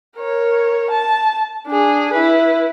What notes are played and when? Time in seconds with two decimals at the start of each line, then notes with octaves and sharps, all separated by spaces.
0.16 A#4 C#5
0.90 A5
1.67 D4 G#4
2.13 E4 B4